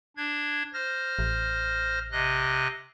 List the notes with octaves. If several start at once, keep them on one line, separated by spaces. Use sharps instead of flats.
D4 G#6
C5 F6 A#6
A1
C3 D#5 F#6